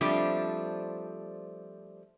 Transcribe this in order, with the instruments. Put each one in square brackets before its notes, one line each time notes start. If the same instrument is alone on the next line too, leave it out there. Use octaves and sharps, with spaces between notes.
[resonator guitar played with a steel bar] F3 G3 A3 C4 D4